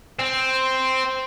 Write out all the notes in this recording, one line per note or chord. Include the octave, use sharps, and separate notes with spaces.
C4